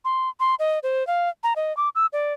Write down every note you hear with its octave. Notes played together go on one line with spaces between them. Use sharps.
C6
C6
D#5
C5
F5
A#5
D#5
D6
E6
D5